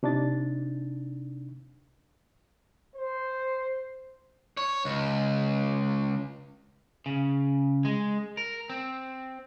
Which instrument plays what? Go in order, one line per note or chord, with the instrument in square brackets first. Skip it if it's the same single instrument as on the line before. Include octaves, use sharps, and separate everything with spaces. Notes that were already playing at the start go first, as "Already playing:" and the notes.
[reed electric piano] C3 D4 D#4 A6
[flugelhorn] C5
[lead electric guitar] C#5
C#2
[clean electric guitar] C#3
G#3
A#4
C4